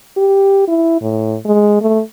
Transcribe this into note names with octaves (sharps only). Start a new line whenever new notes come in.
G4
E4
A2
G#3
A3